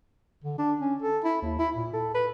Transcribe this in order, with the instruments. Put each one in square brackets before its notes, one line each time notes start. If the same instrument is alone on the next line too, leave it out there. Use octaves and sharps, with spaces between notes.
[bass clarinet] D3
D4
C#4
A4
E4
D#2
E4
A#2
A4
B4